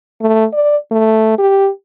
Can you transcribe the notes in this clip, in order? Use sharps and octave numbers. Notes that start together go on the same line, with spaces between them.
A3
D5
A3
G4